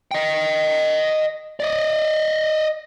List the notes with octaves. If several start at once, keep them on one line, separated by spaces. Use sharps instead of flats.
D#5 G5
D5 D#5